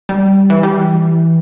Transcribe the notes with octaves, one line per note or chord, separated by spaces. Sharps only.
G3
E3
G3
E3